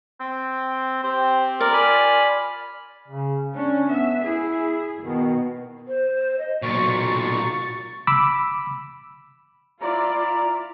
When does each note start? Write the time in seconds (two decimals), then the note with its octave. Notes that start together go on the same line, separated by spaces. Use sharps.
0.20 C4 G5
1.03 C4 G4 C5
1.60 F4 A#4 D5
1.73 G#5 B5 F6
3.08 C#3
3.56 C#4 D4
3.90 B3 E5
4.25 E4 G#4
5.02 B2 D#3
5.88 C5
6.39 D#5
6.62 B1 A#2 F#4 C#6 A6
8.07 B5 D6 E6
9.81 E4 F4 D5 A#5